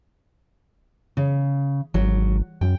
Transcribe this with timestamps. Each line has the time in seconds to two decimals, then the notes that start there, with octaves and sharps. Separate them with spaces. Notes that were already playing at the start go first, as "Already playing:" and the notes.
1.17 C#3
1.94 G#1 F#3
2.61 F#2 G5